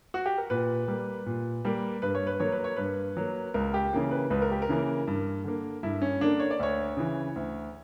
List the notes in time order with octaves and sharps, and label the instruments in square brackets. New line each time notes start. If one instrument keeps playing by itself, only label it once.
[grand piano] F#4
G4
A#4
A#2 B4
G3 A#3
A#2
G3 A#3
G2 B4
C#5
B4
F#3 A#3 C#5
B4
C#5
G2 B4
F#3 A#3
C#2 A#4
G4
C#3 E3 A#3
B4
C#2 B4
A#4
G4
A#4
C#3 E3 A#3
G2
D3 A#3
G2 E4
C#4
D3 A#3 D4
C#5
D5
D2 C#5
C#3 E3
D2